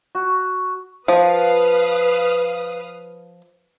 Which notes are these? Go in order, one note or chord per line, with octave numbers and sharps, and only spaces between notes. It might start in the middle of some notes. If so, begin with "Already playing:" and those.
F#4
F3 B4 F5 D#6